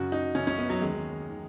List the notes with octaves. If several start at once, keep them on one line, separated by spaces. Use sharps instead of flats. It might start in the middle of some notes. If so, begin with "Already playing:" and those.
Already playing: F#2 C#3 F#4
D#4
F#2 C#3 C#4
C#4
B3
F#3
D#2 D#3 G#3
D#3